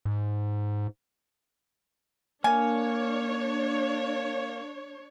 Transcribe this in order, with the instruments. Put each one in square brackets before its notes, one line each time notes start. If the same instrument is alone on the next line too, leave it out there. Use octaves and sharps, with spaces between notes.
[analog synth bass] G#2
[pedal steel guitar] A#3 [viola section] D4 C#5 [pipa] G#5